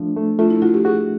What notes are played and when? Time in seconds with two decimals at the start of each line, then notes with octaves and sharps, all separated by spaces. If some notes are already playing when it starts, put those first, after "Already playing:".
Already playing: F3 A3 D4
0.17 A3
0.39 A3 F4
0.50 E4
0.62 F4 F#4
0.74 G4
0.85 F#4 G#4